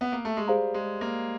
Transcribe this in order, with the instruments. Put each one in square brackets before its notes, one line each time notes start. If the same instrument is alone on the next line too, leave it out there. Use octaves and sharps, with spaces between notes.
[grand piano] B3
A#3
A3
G#3
[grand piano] G3 [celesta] G#4 C5 F5 A#5
[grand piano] G#3
A#3